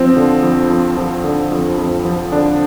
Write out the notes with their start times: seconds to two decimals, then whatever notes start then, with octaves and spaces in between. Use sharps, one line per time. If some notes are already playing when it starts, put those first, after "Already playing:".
Already playing: F3 C4
0.17 D3
0.43 F2
0.70 F2
0.97 F3
1.24 D3
1.52 F2
1.78 F2
2.05 F3
2.32 D3 D4